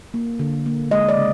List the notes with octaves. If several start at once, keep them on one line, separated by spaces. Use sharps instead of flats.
A#3
D3
A#3
G#3 D#5
D5
C#3